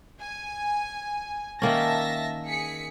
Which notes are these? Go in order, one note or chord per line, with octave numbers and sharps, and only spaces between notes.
G#5
D#3 A#3 C#4 E5 A5 A#6
G#4 B6 C#7